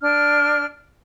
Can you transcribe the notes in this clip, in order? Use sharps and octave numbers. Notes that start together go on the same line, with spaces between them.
D4 F6